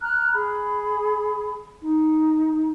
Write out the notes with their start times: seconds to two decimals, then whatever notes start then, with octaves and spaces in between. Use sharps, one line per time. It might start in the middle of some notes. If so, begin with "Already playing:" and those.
0.01 A#5 F6 F#6
0.33 G#4 B5
1.81 D#4